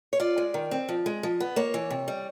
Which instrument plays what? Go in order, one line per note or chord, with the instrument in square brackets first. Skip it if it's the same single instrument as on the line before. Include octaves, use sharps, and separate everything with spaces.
[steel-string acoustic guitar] C#5
F4 D5
G#3
D#3
C4
F3
G#3
F3
B3
A#3 C#5
E3
C3
G3